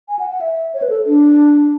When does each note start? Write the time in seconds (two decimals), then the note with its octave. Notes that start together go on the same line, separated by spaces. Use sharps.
0.08 G#5
0.19 F#5
0.31 F#5
0.41 E5
0.74 C#5
0.82 B4
0.90 A4
1.06 D4